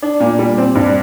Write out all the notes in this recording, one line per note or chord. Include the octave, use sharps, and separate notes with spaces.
D4
A#2
G3
C4
G2